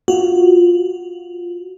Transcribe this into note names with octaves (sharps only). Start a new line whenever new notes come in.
F4 F#4